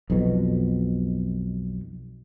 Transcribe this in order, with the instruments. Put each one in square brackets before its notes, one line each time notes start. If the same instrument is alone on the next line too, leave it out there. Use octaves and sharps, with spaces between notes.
[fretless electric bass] B1 F2 B2